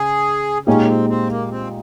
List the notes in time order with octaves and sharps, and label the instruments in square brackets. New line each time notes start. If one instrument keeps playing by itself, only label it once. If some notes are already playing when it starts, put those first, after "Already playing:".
Already playing: [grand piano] C#3 [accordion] G#4
[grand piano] A#2 G#3 D#4 G4 [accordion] C#4
[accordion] A#3
C4
C4
A#3
C4